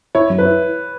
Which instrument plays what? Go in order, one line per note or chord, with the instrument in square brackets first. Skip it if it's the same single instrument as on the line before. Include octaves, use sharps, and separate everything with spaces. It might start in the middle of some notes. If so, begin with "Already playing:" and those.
[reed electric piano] E4 [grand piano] C#5
[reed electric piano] F#2
[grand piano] B4
[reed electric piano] E4